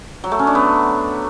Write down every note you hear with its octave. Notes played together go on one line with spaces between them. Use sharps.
F#3
A3
C#4
D4
B3